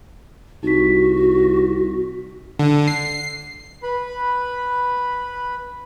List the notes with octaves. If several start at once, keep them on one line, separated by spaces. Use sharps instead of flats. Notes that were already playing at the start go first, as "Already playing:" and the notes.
C2 D#4 F#4 B6
D3
C7
B4 B5